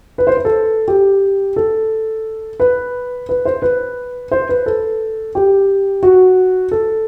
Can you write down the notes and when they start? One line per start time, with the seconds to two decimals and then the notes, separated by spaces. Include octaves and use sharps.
0.18 B4
0.27 C5
0.37 B4
0.45 A4
0.88 G4
1.56 A4
2.60 B4
3.29 B4
3.45 C5
3.62 B4
4.31 C5
4.49 B4
4.66 A4
5.35 G4
6.03 F#4
6.71 A4